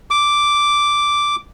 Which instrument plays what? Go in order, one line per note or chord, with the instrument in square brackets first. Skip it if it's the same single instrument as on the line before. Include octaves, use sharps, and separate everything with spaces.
[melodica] D6